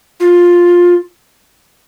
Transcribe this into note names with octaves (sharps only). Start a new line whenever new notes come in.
F4